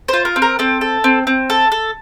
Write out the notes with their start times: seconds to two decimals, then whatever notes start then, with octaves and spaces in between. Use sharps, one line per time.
0.08 F4 C5
0.25 A#4
0.36 C4
0.42 A#4
0.59 C4 A4
0.81 A4
1.04 C4
1.27 C4
1.50 A4
1.72 A4